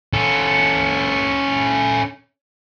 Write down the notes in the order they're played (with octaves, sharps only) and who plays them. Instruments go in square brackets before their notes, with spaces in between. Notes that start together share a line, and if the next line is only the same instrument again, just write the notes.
[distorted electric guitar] C#4 A4